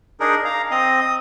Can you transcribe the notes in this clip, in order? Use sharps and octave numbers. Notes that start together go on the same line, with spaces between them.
D4 D#4 G#4 A#4
F5 A#5
C4 D#5 D#6
D#6